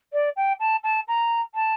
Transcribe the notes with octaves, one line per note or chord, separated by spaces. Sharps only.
D5
G5
A5
A5
A#5
A5